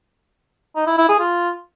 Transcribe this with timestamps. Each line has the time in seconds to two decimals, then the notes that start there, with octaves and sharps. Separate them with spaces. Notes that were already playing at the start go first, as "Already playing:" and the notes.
0.76 D#4
0.87 E4
0.98 E4
1.09 G#4
1.19 F4